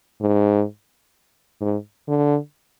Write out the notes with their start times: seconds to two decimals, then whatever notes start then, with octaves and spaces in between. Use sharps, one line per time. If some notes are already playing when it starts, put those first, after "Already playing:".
0.21 G#2
1.61 G#2
2.08 D3